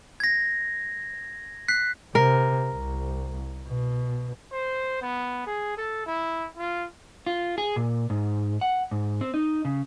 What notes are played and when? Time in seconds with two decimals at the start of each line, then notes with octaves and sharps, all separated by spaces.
0.20 G#6 A#6
1.68 F#6 B6 C7
2.15 C3 A#4
2.73 C2
3.67 B2
4.52 C5
5.02 B3
5.47 G#4
5.77 A4
6.06 E4
6.57 F4
7.27 F4
7.58 G#4
7.76 A#2
8.10 G#2
8.61 F#5
8.91 G#2
9.21 C4
9.34 D#4
9.65 C#3